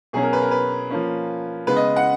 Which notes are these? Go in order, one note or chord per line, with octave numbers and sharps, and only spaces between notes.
B2 F#3 C#4 G#4
A#4
B4
A#4
B4
F3 A#3 C#4
C#3 G#3 B3 B4
D#5
F#5